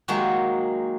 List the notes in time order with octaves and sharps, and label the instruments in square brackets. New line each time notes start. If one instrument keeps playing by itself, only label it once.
[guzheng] D#3 F#3 G#3 A#3 F#4